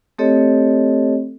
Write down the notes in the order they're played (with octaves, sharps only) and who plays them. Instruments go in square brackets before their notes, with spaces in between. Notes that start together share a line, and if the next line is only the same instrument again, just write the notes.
[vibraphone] A3 C4 G4 A4 C#5 D#5